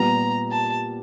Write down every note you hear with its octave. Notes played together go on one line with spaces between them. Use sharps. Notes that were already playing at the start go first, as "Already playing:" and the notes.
Already playing: A#2 G3 B3 A#5
A5